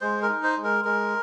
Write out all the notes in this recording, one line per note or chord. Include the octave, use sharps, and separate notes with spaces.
G#3 C5
A#4
D#4
C5
G#3
A#4
G#3 A#4